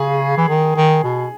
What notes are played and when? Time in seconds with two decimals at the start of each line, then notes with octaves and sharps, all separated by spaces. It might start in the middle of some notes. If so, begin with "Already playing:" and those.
Already playing: C#3 G#4
0.37 E3
0.49 D#3
0.76 D#3
1.04 B2